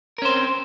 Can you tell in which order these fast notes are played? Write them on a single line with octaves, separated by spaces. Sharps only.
A#4 C#4 C5 C4